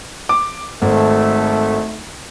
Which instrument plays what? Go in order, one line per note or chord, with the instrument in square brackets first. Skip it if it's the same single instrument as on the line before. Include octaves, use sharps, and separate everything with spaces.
[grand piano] D6
[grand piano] G#1 [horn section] A3